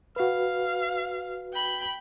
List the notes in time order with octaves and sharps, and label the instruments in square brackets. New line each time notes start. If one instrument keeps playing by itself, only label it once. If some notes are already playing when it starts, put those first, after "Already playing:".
[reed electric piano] F#4 B4 [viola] F5
[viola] G5 B5